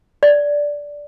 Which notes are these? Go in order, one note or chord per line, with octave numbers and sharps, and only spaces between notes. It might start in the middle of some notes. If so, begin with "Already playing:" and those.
D5